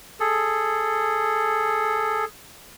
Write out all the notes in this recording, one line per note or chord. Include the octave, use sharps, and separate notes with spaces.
G#4 A4